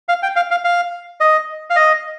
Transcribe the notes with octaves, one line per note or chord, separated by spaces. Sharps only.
F5
G5
F5
F5
F5
D#5
F5
D#5